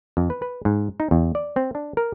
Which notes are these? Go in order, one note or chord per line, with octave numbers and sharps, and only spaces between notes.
F2
B4
B4
G#2
D#4
E2
D5
C4
D4
A#4